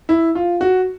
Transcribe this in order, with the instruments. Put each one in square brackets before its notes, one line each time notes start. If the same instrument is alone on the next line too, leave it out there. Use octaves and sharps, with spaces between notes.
[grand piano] E4
F4
F#4